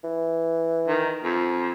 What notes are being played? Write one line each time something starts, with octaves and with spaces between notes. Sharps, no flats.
E3
D#3
F2